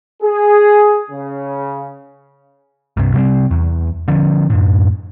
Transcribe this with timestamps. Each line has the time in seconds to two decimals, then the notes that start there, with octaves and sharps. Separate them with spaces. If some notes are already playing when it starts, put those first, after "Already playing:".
0.23 G#4
1.11 C#3
2.97 C2 G2 C3
3.14 C3 G3 C4
3.51 E2
4.08 D3 F3 C#4
4.50 F#2 A2